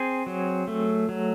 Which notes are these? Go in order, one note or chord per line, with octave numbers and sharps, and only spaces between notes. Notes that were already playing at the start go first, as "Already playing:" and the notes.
Already playing: C4 G#4
F#3
A3
F#3